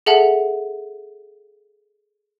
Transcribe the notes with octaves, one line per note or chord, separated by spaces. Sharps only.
G#4 A4 E5 F#5 A5